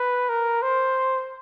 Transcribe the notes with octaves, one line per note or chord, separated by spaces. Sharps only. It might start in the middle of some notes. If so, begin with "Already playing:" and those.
Already playing: B4
A#4
C5